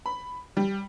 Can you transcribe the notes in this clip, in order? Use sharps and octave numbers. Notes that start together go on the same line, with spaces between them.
B5
G3